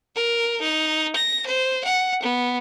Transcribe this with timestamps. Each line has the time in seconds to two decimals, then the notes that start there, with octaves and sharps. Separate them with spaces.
0.16 A#4
0.61 D#4
1.15 A#6
1.46 C5
1.84 F#5
2.23 B3